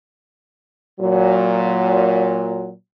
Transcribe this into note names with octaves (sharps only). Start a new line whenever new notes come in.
A#2 F#3